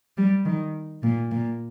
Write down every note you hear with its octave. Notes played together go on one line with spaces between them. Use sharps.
G3
D#3
A#2
A#2